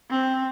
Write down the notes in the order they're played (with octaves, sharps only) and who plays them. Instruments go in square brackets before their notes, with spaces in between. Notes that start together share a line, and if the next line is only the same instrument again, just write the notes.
[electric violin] C4